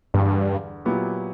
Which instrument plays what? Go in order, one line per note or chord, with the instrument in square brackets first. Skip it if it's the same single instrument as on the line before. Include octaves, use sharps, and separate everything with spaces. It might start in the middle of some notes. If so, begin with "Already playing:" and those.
[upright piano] E2 D3 G3 [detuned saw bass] G2
[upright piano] A#2 F#3 B3 E4 G4